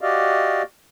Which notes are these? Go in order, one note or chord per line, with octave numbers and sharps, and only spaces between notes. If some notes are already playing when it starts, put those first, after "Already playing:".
F#4 G4 D5 D#5 F5